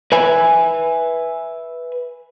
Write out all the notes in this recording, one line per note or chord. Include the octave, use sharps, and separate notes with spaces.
B4 E5 G#5